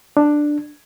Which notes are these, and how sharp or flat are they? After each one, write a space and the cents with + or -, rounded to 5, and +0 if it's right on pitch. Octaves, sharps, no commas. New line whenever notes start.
D4 +5